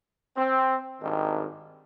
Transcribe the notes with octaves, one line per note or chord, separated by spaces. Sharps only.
C4
G#1 G2 D#3